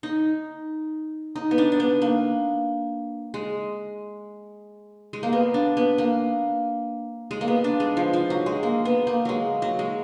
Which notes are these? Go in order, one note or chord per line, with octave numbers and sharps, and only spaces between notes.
D#4
D#4
B3
D4
D4
B3
A#3
G#3
G#3
A#3
B3
D4
B3
A#3
G#3
A#3
B3
D4
G#3
F3
F3
F#3
G#3
A#3
B3
A#3
F#3 G#3
F#3
G#3